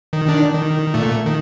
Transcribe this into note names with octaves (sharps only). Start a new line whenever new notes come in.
D#3
D#3 D4
D#3
A#2 A3
D#3